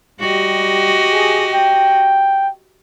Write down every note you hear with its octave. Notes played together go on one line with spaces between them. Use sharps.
G3 F#4 G4 D#5
G#4
G5